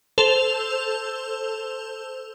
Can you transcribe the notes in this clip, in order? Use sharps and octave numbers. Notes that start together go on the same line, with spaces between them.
A4 C5 F7